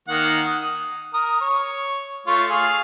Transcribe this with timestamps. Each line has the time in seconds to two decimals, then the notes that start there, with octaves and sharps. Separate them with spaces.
0.08 D#3 A#3 F#5
0.45 D#6
1.14 A#4 D#6
1.41 C#5
2.27 A3 F4 C#5
2.50 G#4 F5